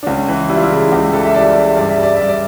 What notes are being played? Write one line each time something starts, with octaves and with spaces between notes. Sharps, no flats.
D4
C#2 C#4
E3
G3 E4
F4
E4
C#3
C#2 G4
E3 A4
E5
G3 D5
C#3 E5
G2 D5
E5
G3 D5
G2 E5
D5